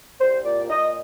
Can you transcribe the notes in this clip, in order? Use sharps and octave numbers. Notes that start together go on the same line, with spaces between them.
C2 C5
A#2 D5
A#2 D#5